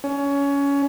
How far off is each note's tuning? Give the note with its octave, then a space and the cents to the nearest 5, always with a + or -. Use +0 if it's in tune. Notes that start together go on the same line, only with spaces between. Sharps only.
C#4 +20